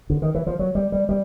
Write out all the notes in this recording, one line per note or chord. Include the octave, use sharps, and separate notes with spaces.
D3
D#3
E3
F3
F#3
G3
G3
G3